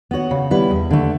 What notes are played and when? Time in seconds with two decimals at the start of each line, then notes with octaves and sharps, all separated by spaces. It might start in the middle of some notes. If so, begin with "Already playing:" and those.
0.11 B3 F#4 C#5
0.31 C#3
0.51 G3 B3 E4 B4
0.71 E2
0.90 D3 A3